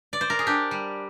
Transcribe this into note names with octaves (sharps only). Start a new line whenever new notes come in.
D5
C5
A#4
G#4
D4 G4
G3